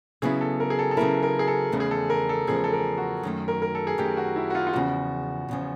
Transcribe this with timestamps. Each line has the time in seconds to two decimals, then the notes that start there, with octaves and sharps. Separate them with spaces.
0.22 C#3 F#3 B3 E4 G#4
0.41 A4
0.60 A#4
0.70 G#4
0.79 A4
0.91 A4
0.97 C#3 F#3 B3 E4 A#4
1.23 A#4
1.39 G#4
1.48 A4
1.72 E2 C#3 F3 A3
1.80 G#4
1.91 A4
2.10 A#4
2.29 A4
2.47 E2 C#3 F3 A3 G#4
2.64 A4
2.73 A#4
2.98 F#4
3.23 F#2 D#3 F#3 A3
3.48 A#4
3.62 A#4
3.75 A4
3.87 G#4
3.98 F#2 D#3 F#3 A3 G4
4.17 F#4
4.36 E4
4.50 F#4
4.55 F4
4.67 F4
4.73 E2 C#3 F3 F#4
5.49 E2 C#3 F3